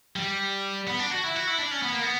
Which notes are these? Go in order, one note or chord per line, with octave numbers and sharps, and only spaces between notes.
G3
B3
D4
F#4
E4
F#4
E4
D4
C#4
B3
A#3
B3